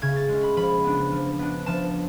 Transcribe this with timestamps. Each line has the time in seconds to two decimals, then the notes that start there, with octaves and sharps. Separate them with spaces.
0.02 C#3 G#6
0.16 A6
0.29 G#3 C#4
0.43 B5
0.57 F3 B5
0.84 B3 D4
1.12 F3
1.39 B3 D4
1.66 F3 A5